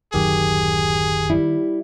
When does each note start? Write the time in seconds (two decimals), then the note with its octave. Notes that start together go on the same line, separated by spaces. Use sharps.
0.14 D1 F#2 D#3 F#3 G4 G#4
1.30 G3 E4